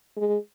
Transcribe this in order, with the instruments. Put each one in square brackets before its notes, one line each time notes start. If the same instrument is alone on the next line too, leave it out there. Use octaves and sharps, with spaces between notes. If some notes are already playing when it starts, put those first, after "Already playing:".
[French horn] G#3